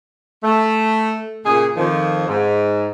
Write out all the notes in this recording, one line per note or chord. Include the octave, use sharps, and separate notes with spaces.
A3
A#2 C#3 G#4
F2 D#3 F3
G#2